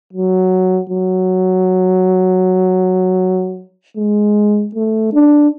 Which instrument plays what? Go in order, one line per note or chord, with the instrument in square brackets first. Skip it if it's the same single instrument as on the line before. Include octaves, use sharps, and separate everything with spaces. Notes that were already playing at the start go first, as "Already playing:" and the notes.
[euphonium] F#3
F#3
G#3
A3
D4